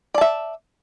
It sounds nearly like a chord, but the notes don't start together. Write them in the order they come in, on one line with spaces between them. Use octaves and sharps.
D5 A5 E5